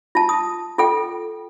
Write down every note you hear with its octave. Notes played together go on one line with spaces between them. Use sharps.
F4 A5
D#6
F4 A4 G5